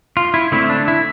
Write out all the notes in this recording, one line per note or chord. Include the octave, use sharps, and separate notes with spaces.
F4
E4
D3 A3 C4 E4
D4
E4